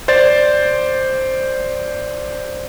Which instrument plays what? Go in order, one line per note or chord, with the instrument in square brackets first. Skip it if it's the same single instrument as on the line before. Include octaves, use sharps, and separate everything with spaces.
[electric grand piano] C5 D5 A6